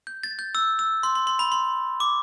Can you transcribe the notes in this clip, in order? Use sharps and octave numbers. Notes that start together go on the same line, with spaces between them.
G6
A6
G6
E6
E6
C6
C6
C6
B5
C6
D6